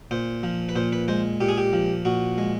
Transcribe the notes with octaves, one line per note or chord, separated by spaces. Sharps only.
A#2 C5
F3
B4
A#2 C5
B4
G#3 C5
A#2 G4
G#4
G4
F3
A#2 F#4
G#3